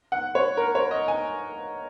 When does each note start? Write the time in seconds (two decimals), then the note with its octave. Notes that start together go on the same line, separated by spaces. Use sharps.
0.12 F#5
0.35 C#5
0.57 A#4
0.75 C#5
0.91 D#5
1.08 G#5